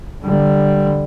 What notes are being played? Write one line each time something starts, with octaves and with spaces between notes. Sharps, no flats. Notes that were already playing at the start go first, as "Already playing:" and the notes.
D3 G3